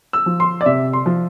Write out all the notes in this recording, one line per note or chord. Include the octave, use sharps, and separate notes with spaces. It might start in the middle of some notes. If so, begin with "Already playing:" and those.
E6
F3
C6
D5
C3 E5
C6
F3